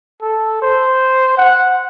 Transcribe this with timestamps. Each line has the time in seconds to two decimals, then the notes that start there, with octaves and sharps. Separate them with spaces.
0.22 A4
0.62 C5
1.38 F#5